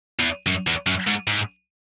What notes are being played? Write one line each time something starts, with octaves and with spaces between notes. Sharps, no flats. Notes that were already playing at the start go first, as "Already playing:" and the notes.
E2
F#2
E2
F#2
G#2
G#2